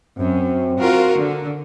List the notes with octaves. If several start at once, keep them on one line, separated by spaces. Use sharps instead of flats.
F#2 C4
F4 F#4 A#4
D3